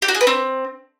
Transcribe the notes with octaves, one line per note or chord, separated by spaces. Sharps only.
G4
F#4
G#4
B4
C4